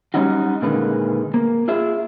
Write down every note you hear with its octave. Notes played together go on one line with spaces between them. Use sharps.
F#3 G3 C#4 D#4 F4 F#4
A#2 D3 D#3 G#3 B4
A#3
F4 G#4 E5